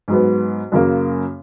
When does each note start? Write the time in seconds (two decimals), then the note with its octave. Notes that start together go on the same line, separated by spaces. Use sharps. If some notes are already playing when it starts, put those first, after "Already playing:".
0.08 G#2 F#3 B3
0.72 F#2 C#3 F#3 A#3